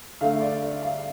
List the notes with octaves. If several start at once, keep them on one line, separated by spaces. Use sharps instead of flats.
D3 A3 F5
D5
E5
F5